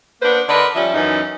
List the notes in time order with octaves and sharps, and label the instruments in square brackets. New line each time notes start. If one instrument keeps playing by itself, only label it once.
[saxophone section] A#3 B3 D4 B4 C5
D3 A#4 B4 D5 D#5
F3 G3 C#4 E5
F#2 E3 C#4 D#4